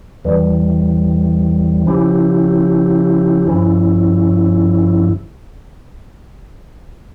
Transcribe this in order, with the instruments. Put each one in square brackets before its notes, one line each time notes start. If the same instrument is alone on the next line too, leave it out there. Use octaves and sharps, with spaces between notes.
[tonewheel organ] E2 E3 G3
C#3 F3 C#4 E4 G4
G2 F3 C#4 E4